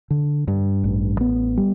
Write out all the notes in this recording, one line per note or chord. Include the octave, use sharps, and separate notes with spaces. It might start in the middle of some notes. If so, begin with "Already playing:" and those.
D3
G2
A1
B3
G3